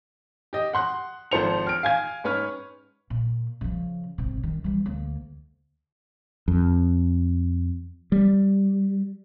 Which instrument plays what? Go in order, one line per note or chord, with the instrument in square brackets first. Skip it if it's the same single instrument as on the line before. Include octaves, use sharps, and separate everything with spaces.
[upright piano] G4 D#5
F#5 C6 F#6
G#1 F3 A4 C5 C#7 F7
F6 D7
F5 G#5 G#6
G#2 C#4 B4 C#5 F6
[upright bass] A#2
C#3 F3
G#1 C3
D#3
E3 G3
D2 A#3
[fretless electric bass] F2
G3